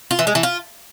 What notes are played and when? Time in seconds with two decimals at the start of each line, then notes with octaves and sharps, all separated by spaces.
0.11 F4
0.19 E3
0.27 G#3
0.35 E3
0.43 F4